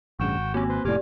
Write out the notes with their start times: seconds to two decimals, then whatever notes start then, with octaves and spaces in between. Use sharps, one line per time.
0.20 A1 G2 C#3 F#4 G5 C#6 E7
0.37 G#1
0.54 A#3 C4 C#4 F#4 G4 G#5
0.69 B4 C5
0.85 F1 A2 G4 D5 G#5 D6 F6